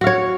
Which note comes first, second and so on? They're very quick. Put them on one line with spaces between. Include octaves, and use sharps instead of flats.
F#4 F5 C#5